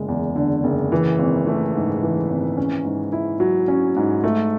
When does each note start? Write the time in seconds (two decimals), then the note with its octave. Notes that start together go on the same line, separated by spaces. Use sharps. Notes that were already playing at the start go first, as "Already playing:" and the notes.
Already playing: F#1 D3 G#3
0.08 E2
0.36 D3
0.64 F#1
0.92 E3
1.19 G#1
1.47 A3
1.75 G#2
2.02 E3
2.30 G#1
2.57 C#4
2.85 G#2
3.12 E4
3.40 F#3
3.68 C#4
3.96 G#2
4.24 A3